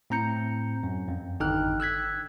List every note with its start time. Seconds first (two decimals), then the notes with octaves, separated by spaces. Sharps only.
0.10 A2 C4 A#5 G6 C#7
0.83 F#2
1.08 F2
1.40 G#1 D3 D#4 G5 F6 F#6
1.80 E6 F#6 G#6 B6